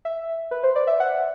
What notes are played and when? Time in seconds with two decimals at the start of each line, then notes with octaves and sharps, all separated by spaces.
0.05 E5
0.51 B4
0.63 C5
0.76 D5
0.87 E5
1.00 F#5